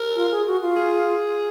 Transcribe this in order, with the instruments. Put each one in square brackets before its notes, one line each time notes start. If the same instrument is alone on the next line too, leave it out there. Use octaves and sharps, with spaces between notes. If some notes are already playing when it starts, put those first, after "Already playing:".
Already playing: [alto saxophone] A#4
[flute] F4
G#4
F#4
F4
[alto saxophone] G#4